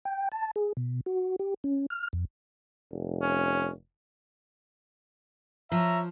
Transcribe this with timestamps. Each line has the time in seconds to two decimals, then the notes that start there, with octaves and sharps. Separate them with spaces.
0.05 G5
0.32 A5
0.56 G#4
0.77 B2
1.06 F#4
1.39 G4
1.64 C#4
1.90 F6
2.13 F2
2.91 F1
3.22 C#4
5.72 F3 C#5 E5 A#5